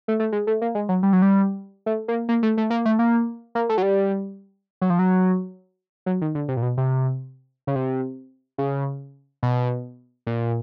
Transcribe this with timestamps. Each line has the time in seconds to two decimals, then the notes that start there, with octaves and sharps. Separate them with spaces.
0.08 A3
0.20 A3
0.32 G#3
0.47 A3
0.62 A#3
0.75 G#3
0.89 F#3
1.03 G3
1.13 F#3
1.22 G3
1.86 A3
2.08 A#3
2.29 A#3
2.43 A3
2.58 A3
2.70 A#3
2.85 A3
2.99 A#3
3.55 A#3
3.69 A3
3.78 F#3
3.82 G3
4.81 F#3
4.90 F3
4.99 F#3
6.06 F#3
6.21 D#3
6.35 D3
6.48 C3
6.57 A#2
6.62 B2
6.77 C3
7.67 C#3
7.75 C3
8.58 C#3
9.43 B2
10.27 A#2